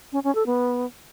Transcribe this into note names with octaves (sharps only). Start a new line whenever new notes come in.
C#4
C#4
A4
B3